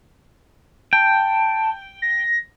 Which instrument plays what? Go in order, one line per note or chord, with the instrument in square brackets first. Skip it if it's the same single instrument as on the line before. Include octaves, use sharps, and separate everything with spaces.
[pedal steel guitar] G5 [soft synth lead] A5
[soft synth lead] A#6